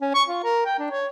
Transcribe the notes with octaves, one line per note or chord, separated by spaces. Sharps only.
C#4
C#6
F4
A#4
G5
D4
C#5